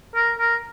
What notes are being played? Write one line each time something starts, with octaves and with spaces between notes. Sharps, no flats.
A#4
A#4